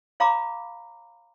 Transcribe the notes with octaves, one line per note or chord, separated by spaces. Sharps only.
C#5 F5 A#5 B5 D6